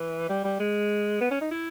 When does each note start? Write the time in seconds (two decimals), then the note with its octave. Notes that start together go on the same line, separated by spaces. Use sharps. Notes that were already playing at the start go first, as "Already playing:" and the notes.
Already playing: E3
0.29 G3
0.44 G3
0.60 G#3
1.21 B3
1.31 C#4
1.41 D#4
1.51 E4